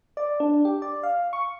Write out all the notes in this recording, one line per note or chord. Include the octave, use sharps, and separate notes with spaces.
D5
D4
G4
D5
F5
C#6